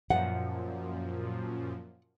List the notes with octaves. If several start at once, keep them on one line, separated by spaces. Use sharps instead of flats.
F#2 A#2 F3 F#5